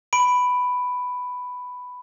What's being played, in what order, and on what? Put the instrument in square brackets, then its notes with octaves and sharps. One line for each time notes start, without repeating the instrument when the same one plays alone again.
[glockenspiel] B5 D7